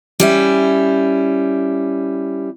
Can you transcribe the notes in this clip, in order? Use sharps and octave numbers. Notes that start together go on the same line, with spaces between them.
G3 C#4 E4